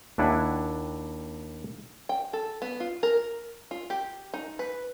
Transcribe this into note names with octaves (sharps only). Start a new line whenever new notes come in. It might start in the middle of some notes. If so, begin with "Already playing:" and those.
D#2 D4 E4 F#5 G#5
G5
A4
B3
F4
A#4
F4
G4
D#4
B4